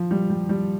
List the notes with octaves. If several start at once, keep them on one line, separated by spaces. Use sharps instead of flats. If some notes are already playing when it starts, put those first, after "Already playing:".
Already playing: F3
G3
G3
G3